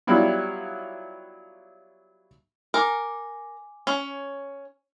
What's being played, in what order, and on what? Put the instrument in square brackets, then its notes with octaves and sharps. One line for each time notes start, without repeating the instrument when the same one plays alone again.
[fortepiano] F#3 G3 B3 E4 F4
[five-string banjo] A#4 [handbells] G#5 D6
[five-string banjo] C#4